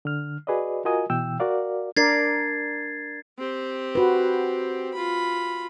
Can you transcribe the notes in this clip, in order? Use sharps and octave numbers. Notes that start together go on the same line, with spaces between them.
D3 F6
F#4 G#4 B4 D5 D#5
F4 F#4 A#4 D#5 G#5 D#6
B2 E3 G5 E6
F#4 A#4 D5 F5
D4 A#4 D5 G#6 A6 C7
C4 G4
F#4 B4
F4 B5